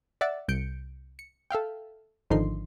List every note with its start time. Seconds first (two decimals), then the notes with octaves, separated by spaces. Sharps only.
0.21 D5 E5 F#5 A6
0.48 C2 G6 C#7 D7
1.19 C#7
1.51 A4 E5 F5 G5
2.30 G#1 D3 D#3 F3 D#4 C6